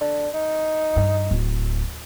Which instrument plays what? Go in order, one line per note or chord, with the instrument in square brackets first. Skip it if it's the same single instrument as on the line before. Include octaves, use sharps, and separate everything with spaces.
[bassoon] D3
D#4
[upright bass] G2
D1